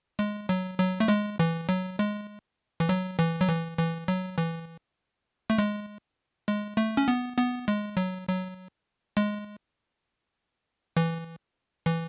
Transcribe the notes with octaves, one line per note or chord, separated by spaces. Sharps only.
G#3
F#3
F#3
A3
G#3
E3
F#3
G#3
E3
F#3
E3
F#3
E3
E3
F#3
E3
A3
G#3
G#3
A3
C#4
B3
B3
G#3
F#3
F#3
G#3
E3
E3